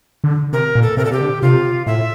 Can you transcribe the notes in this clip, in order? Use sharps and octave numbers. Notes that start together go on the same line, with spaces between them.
D3
C3 A#4
A#2
A4
C3 A#4
A#2 A4
C3 G4
D3
C3 F4
A2 E5